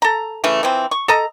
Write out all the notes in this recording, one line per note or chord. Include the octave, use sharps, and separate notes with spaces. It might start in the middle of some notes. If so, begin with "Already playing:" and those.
A4 A#5
C#3 E3 A3
E3 F3 C4
C#6
A4 D#5 A#5